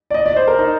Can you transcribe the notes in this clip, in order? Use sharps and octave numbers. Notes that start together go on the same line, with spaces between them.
D5
D#5
D5
C5
A#4
D#4